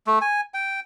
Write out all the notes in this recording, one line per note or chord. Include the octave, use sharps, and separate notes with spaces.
A3
G#5
G5